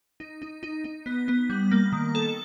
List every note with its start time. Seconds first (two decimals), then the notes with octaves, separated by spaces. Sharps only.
0.20 D#4
0.42 D#4
0.63 D#4
0.84 D#4
1.06 B3
1.28 B3
1.50 G3
1.71 A#3
1.92 D#3
2.15 A4